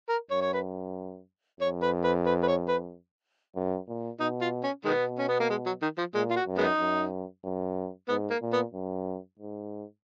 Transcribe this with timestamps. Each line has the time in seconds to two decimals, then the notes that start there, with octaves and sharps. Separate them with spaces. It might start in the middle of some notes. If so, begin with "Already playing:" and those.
0.09 A#4
0.31 F#2 C#5
0.41 C#5
0.53 B4
1.60 F2 C#5
1.82 B4
2.04 B4
2.26 B4
2.43 B4
2.48 C#5
2.69 B4
3.55 F#2
3.88 A#2
4.20 B2 D#4
4.41 F4
4.63 C#4
4.85 B2 D#3 G#3 B3
5.19 C#4
5.28 B3
5.40 A#3
5.50 G#3
5.66 F#3
5.82 D#3
5.98 F3
6.15 A#2 G#3
6.30 F4
6.36 F#4
6.47 F#2
6.58 G#3 B3 D#4
6.79 F#2
7.44 F#2
8.08 G#2 B3
8.30 A#3
8.42 A#2
8.53 B3
8.73 F#2
9.39 G#2